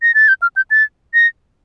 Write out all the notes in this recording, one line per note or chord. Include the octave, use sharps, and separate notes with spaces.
A#6
A6
G6
F6
G6
A6
A#6